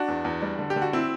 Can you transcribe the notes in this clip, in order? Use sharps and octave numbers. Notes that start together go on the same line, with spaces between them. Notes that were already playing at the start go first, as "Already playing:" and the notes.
Already playing: D4 F#4
E2
E2
G3
D3
G4
D3
F#4
C4 E4